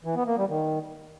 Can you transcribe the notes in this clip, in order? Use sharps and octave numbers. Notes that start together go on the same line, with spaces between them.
E3
B3
A#3
G3
D#3